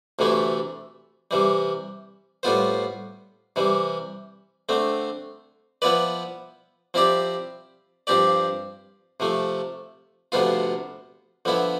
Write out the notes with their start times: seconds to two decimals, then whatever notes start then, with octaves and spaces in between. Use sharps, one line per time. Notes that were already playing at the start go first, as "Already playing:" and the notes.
0.19 D2 C3 E3 A3 E4
1.31 C3 E3 G3
2.43 A2 G3 B3 F4 C5
3.56 C3 E3 G3
4.69 D3 A3 C4
5.82 F3 B3 E4 B4 D5
6.94 F3 C4 E4 G4 D5
8.07 G2 F3 C4 G4 D5
9.20 C3 F3 A3
10.32 D2 C3 F3 B3 F4
11.45 D3 F3 B3 E4